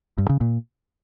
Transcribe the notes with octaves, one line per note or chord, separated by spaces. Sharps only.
G2
C#3
A#2